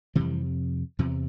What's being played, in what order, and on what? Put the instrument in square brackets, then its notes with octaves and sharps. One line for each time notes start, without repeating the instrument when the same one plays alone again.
[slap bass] F2 C3 E3 G3
E2 C3 F3